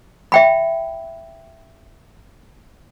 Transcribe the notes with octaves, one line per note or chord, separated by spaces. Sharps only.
E5 G5 B5